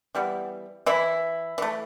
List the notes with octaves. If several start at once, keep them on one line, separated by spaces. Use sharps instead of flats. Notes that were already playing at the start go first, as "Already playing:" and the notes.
E3 G3 B3
E3 E4
E3 A3